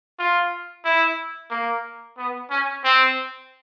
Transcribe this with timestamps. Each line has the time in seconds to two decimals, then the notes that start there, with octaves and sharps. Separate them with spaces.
0.19 F4
0.85 E4
1.51 A#3
2.18 B3
2.50 C#4
2.84 C4